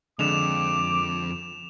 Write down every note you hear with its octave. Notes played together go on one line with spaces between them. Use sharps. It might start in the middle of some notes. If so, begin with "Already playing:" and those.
F2 D3 G#3 D6 E7 F7